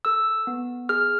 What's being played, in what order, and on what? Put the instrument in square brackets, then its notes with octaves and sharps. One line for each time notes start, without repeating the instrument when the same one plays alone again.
[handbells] A4 E6
B3
G#4 F6